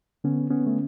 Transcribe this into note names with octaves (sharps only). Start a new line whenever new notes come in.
D3 B3 C#4
B3 C#4
A3